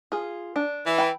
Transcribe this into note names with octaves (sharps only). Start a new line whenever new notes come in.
F4 G#4
D4
E3
G5 B5